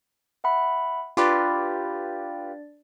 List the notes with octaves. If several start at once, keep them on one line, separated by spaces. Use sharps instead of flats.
E5 F#5 B5
D4 F4 G4 B4 D5 A6